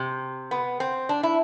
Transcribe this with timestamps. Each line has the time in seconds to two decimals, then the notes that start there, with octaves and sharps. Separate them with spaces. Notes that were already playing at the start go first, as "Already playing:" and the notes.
Already playing: C3
0.51 B3
0.80 C4
1.09 D4
1.23 E4